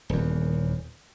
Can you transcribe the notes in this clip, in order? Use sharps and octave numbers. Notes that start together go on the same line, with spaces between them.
D#1 E2